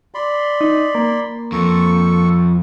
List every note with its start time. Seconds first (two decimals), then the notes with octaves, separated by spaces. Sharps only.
0.14 D5 B5 C6
0.61 D#4
0.95 A#3
1.52 F2 A4 C#6